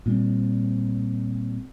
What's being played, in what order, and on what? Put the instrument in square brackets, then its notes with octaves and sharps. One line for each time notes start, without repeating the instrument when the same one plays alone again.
[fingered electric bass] A#2 G3 C4